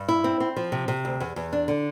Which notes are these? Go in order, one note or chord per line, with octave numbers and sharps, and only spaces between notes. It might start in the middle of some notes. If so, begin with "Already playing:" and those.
Already playing: G2
E4
C4
C4
F3
C3
C3
D2
E2
E2
D4
D3